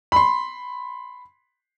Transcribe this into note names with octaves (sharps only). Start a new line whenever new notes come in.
B5 C6